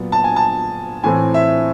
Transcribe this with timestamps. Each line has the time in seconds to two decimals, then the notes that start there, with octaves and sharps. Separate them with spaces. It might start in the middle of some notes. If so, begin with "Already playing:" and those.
Already playing: A#2 F#3 B3
0.12 A5
0.24 G#5
0.36 A5
1.04 A2 E3 A3 C4 G#5
1.34 E5